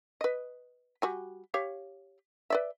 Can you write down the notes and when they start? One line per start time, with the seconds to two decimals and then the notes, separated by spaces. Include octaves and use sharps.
0.21 B4 D#5
1.02 G3 F#4 G#5
1.54 G4 C#5 F5
2.50 B4 D5 E5